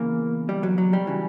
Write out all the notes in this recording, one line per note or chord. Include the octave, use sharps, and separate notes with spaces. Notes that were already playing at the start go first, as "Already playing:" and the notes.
Already playing: E2 C#3 E3 A#3
G3
F#3
F#3
G3
C#3 E3